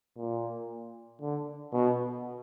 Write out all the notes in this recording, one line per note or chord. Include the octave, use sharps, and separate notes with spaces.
A#2
D3
B2